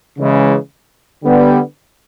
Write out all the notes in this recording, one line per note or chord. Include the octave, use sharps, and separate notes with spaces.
C#3 E3 G#3
D3 G3 B3